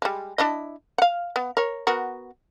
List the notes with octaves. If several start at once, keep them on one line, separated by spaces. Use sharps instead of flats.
G3 G#3
D4 E4 D#5
F5 F#5
B3
A#4 C#5
B3 F#4 A#4